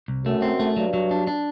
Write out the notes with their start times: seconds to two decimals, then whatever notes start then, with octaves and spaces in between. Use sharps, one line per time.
0.08 C2
0.25 F#2 A3
0.42 C4
0.60 A3
0.77 G2 F#3
0.94 F#3
1.11 D4
1.27 D4